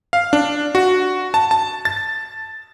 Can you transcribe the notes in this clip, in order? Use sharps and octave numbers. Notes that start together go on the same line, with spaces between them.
F5
D4
F#4
A5
A5
A6